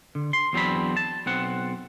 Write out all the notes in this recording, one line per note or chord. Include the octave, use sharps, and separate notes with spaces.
D3
C6
E2 F#3 C4 D4 B5
A5
B1 C4 F#5